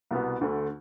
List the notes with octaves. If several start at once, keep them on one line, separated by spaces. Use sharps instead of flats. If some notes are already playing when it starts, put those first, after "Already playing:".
C2 B2 B3
D2 D3 A3